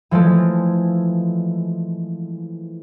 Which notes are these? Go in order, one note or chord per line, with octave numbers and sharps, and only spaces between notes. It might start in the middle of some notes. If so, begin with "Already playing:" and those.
E3 F3 G#3 A3